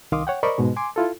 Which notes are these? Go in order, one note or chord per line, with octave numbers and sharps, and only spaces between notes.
C2 D#3 F5 C6 D6 D#6
C#5 F#5 G5
A#4 C5 D5 D#5 B5 C#6
G#2 B2 G#3
G#5 C6 D6
E4 F4 A4